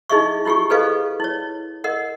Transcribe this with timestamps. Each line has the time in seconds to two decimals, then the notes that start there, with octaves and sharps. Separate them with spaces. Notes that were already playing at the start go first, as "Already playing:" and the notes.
0.09 D#4 E4 G#4 D#5 E5 C#6
0.45 E4 F4 G4 G#4 C#6
0.70 G#4 A4 B4 C5 D#5 F5
1.20 E4 C#5
1.84 A#4 D#5 F#5